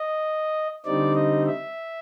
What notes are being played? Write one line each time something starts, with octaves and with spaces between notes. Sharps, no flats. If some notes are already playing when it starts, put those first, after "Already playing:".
Already playing: D#5
D3 G3 C4 D#4 D5
D#5
E5